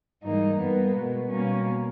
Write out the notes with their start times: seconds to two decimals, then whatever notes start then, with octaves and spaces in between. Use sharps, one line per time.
0.22 G#2 E3 G3 A#3 D#4
0.58 G2 G3 A#3 B3
0.93 B2 G#3 B3
1.30 B2 G3 A#3 C#4